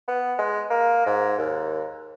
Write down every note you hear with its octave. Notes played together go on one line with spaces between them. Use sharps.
B3
G#3
A#3
G#2
D#2